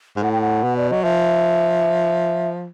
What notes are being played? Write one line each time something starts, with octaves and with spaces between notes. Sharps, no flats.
G#2
A2 F#5
G5
F#5
B2
D5
F#3 D#5
F3 E5